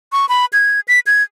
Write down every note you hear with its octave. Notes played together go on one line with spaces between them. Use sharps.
C#6
B5
G#6
B6
G#6